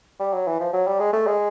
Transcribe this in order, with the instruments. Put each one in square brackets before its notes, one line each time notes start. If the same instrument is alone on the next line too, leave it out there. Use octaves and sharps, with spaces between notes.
[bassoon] G3
F#3
E3
F3
F#3
G3
G#3
A3
G#3